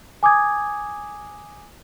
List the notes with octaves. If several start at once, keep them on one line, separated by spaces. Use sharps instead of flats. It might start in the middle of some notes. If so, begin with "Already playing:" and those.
G#5 D6 D#6 G#6